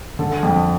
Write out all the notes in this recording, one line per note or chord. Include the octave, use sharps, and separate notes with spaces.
D3 A4
F2